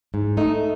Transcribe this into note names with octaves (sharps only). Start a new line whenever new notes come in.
G#2
A3 D#4